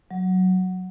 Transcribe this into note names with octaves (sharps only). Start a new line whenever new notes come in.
F#3